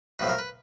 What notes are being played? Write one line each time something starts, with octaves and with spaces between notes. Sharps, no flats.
B1 A2 F3 A3 B4
A#4
B4